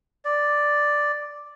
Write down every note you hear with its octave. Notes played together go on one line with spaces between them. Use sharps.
D5